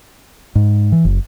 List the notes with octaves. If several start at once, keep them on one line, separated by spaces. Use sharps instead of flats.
G#2
E3
F#1